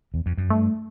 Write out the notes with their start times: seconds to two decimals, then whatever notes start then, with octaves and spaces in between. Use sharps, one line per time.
0.14 E2
0.26 F2
0.37 F#2
0.49 G2 A3